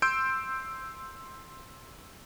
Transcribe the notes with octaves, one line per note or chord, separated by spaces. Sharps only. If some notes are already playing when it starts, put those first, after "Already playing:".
C6 E6 G6 D7